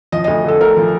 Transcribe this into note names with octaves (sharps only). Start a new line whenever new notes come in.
F3 D#5
D2 D#5
D3 A4
A3 A#4
F3